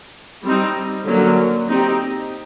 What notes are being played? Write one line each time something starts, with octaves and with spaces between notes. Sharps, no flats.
G3 C4 D#4
D3 F#3 A#3 C#4
C4 D#4 G4